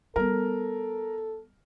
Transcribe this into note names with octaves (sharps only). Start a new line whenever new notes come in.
G3 B3 A4 A#4